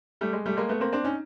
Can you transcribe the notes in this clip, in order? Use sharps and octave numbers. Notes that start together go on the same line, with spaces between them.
G3 A3
G#3
G3 A3
G#3 A#3
A3 B3
A#3 C4
C4 D4
C#4 D#4